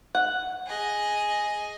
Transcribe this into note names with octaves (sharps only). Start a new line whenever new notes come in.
F#5
G#4 D#5